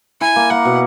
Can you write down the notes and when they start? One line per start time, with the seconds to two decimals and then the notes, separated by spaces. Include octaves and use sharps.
0.21 E4 G#5
0.36 A#3
0.50 A#3 F#5
0.65 B2